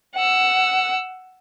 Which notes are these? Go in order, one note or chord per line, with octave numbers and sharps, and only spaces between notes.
F#5 E6